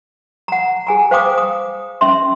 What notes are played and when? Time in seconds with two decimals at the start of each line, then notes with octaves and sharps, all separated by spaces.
0.48 F#5 A#5
0.87 G#4 G#5 A#5
1.11 C5 F5 G5 D6 D#6
1.38 D#6
2.01 C#4 E5 C6